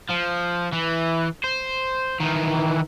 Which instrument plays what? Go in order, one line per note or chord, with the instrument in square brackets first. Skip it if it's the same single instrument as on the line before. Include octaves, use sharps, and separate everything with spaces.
[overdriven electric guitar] F3
E3
C5
D#3 E3